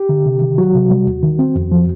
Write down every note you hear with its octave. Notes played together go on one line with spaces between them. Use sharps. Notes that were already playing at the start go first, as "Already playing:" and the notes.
Already playing: G4
D3
C3
D#3
F#3 F#4
C3
G3
D#2
D#3
C4
F2
F3